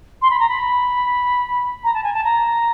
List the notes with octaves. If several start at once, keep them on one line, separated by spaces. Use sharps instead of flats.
C6
B5
A#5
B5
A#5
A5
G#5
A5
A#5